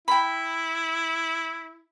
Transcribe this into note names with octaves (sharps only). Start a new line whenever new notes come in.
E4 G5 B5